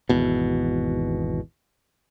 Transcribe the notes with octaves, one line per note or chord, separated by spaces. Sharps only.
G#1 E2 B2